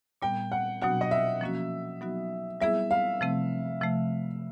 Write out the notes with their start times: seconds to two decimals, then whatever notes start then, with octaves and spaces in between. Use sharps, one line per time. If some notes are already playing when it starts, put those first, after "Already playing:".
0.22 A#2 G3 B3 G5
0.52 F#5
0.82 B2 F#3 B3 D4 F#4 F#5
1.01 D#5
1.11 E5
1.41 F3 A#3 C#4 F#4
2.01 F#3 B3 D#4 F#4
2.61 G3 B3 E4 G#4 E5
2.91 F5
3.21 C3 F3 A3 C4
3.81 C3 F3 A3